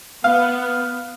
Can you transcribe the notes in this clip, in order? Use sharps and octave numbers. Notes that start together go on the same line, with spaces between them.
B3 F5